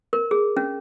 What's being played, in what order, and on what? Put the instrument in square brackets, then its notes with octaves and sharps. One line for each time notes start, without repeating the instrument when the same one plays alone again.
[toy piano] A#4
G#4
C#4